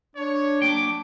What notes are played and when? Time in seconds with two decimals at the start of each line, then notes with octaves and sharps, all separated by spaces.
0.16 D4 C#5
0.62 F#3 A#3 G5 A5 D6